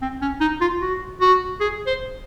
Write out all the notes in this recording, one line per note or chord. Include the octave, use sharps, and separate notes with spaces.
C4
C#4
D#4
F4
F#4
F#4
G#4
C5